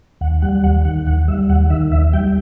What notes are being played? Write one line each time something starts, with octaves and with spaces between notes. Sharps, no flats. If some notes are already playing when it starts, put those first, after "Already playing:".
D#2 F#5
G3 F#5
D#2 F#5
D#3 F#5
D#2 F#5
G3 E5
D#2 F#5
D#3 E5
D#2 E5
G3 G5